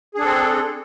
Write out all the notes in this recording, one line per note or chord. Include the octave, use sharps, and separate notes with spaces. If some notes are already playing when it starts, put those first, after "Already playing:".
C4 D4 G#4 A4